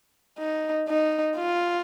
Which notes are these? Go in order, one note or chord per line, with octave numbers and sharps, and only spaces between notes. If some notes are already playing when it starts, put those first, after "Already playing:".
D#4
D#4
F4